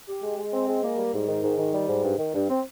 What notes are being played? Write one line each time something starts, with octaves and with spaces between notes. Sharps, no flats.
G4
G#3
G#3
C4
G#3
A#3
G3
G#2
D#3
G#2
D#3
G3
G#2
G2
D#3
G2
C4